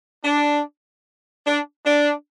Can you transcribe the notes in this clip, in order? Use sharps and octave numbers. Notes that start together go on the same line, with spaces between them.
D4
D4
D4